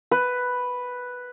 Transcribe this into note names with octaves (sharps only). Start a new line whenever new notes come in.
B4